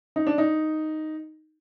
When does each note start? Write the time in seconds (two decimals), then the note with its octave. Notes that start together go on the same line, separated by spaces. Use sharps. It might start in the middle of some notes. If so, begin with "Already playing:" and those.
0.16 D#4
0.27 D4
0.38 D#4